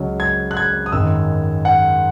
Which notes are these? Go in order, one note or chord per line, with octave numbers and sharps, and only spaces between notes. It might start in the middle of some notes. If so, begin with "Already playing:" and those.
Already playing: C#2 C#3 F#3 C#4
G#6
F#6
G#6
D#6
G#1 F#2 D#3 E6
F#5